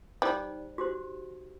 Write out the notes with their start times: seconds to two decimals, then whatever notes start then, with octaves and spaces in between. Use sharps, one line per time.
0.22 G3 D#4 C5
0.78 F#4 G4 C5